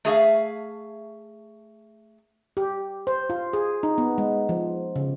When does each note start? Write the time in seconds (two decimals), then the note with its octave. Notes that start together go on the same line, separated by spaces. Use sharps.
0.05 A3 G#4 E5 F5
2.57 G4
3.07 C5
3.30 F4
3.53 G#4
3.83 D#4
3.98 B3
4.18 G#3
4.49 F3
4.96 C#3